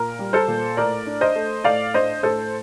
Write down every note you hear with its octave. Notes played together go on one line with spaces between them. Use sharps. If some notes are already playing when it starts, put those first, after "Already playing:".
Already playing: A#2 A#4
G3
A4 C5
A#2
A2 A#4 D5
D4
C5 D#5
A3
A2 D5 F5
D4 C5 D#5
A2 A4 C5